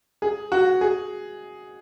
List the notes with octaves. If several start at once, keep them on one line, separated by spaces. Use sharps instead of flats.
G#4
F#4
G#4